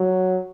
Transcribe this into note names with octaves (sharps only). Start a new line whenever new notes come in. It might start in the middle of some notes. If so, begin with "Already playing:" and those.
Already playing: F#3